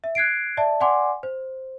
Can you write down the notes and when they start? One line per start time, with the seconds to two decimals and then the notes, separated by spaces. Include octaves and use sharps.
0.04 E5
0.15 F#6 G#6 C7 D7
0.57 D5 E5 A5
0.80 D5 F#5 G#5 C6 D6
1.23 C5